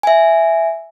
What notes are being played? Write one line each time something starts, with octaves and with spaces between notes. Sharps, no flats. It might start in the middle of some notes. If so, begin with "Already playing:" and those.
E5 G#5